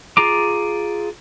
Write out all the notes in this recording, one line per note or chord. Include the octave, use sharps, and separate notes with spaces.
F4 G#4 A#5 D6